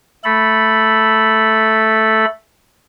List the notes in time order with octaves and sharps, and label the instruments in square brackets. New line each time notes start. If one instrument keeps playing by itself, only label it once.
[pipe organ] A3 A4 B5